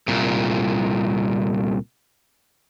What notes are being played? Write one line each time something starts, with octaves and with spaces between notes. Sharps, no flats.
C2 A#2